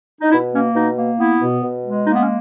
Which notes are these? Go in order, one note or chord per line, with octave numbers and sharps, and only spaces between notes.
D#4
B2 E4
A#3 C#4
B2 D#4
A#3
B3 E4
B2
B2
G#3
A#3 D#4
B3
C#4